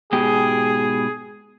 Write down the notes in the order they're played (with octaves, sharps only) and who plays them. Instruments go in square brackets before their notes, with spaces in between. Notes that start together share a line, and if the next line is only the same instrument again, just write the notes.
[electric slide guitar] G#2 B2 G4 [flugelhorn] G#4